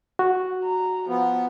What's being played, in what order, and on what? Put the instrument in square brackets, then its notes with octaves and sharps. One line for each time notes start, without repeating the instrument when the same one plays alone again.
[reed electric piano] F#4
[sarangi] A#5
[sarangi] F3 [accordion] B3